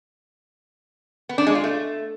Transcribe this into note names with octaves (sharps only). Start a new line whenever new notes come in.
B3
D4
G#3
F4
A3